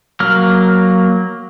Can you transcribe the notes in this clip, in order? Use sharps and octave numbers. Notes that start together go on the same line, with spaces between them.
F#3 A#3 F6